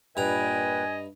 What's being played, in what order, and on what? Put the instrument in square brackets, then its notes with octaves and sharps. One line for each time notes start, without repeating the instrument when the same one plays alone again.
[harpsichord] G2 A#5 [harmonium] A#2 B4 G5 [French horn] D#5 [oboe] G#5